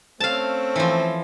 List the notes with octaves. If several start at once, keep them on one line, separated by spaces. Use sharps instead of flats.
A3 C4 C#4 F5 A5
E3 F3